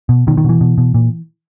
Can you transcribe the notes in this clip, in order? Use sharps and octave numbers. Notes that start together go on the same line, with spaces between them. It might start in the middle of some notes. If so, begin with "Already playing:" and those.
B2
B2 D#3
D#3
B2 E3
B2
B2
A#2